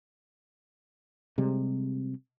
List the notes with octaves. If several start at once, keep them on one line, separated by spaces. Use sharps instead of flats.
C3 G3 G#3